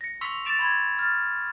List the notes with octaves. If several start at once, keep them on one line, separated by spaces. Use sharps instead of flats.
A#6 C#7
C6 C#6 E6 B6 C#7 F7
D6 A6 D7 E7 F7
B5 C6 G#6
F6 A6